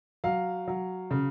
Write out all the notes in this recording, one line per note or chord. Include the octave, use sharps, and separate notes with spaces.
F#3 F5
F#3
C#3